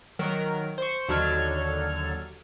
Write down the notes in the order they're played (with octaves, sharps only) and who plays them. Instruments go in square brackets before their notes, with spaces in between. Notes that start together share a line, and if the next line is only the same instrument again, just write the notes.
[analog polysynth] D#3 F#3 A#4
C5 C#6
D#2 D3 F#3 A4 F6 G#6